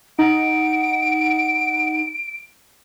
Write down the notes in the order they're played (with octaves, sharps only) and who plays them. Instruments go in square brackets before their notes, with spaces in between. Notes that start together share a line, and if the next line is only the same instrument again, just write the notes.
[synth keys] D#4 [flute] F#5 [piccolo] D7